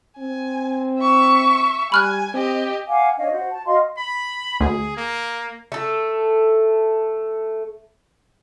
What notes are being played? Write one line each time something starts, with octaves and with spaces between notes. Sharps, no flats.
C4 G#5
E5 C#6
G3 G#5 B5 F6 F#6
C4 G4 D#5
F5 F#5 G#5 D6
D4 C#5 D#5 F5
F#4 C5
A5
F#4 D#5 F5 C6
B5
D2 G#4
A#3
A3 A4